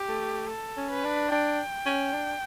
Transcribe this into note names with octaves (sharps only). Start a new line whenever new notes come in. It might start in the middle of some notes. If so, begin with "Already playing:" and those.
Already playing: G4
A3
A4
C#4
B4
D4
D4 G5
C#4
D4